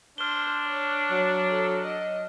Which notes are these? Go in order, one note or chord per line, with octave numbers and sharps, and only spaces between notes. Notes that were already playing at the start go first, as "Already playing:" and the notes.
D4 C5 F6 G7
C#5
F#3
A4
D#5